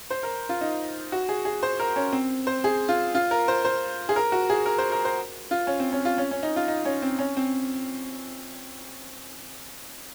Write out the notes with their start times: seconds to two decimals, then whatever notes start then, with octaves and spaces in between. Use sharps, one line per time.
0.10 C5
0.23 A#4
0.49 F4
0.61 D#4
1.12 F#4
1.29 G#4
1.45 G#4
1.63 C5
1.80 A#4
1.96 C#4
2.13 C4
2.47 C5
2.64 G#4
2.89 F4
3.15 F4
3.31 A#4
3.48 C5
3.65 C5
4.09 G#4
4.16 A#4
4.32 F#4
4.50 G#4
4.66 A#4
4.78 C5
4.92 A#4
5.05 C5
5.51 F4
5.67 C#4
5.80 C4
5.93 C#4
6.05 F4
6.18 C#4
6.31 C#4
6.43 D#4
6.56 F4
6.68 D#4
6.85 C#4
7.02 C4
7.19 C#4
7.37 C4